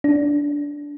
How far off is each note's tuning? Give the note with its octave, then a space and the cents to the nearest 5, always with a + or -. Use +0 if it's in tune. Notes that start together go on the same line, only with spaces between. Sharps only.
D4 -15